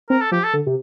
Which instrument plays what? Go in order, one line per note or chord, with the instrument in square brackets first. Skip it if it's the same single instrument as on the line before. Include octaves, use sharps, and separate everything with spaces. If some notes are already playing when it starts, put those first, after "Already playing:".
[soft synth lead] C4 [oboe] A#4
[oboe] A4
[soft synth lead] F3 [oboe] G4
[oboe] A4
[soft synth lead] D3
C3